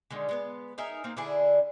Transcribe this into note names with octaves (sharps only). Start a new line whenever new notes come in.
D3 D#3 G#3
G#3 B3 B4
D#4 G#4 A#4 E5
A#3 C4 D#4
D3 D4 E4 G#4